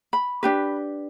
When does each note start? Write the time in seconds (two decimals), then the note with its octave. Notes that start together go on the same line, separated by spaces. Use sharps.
0.13 B5
0.43 D4 G4 B4